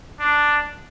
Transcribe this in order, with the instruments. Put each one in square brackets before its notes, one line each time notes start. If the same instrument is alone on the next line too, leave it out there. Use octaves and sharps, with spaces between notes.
[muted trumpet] D4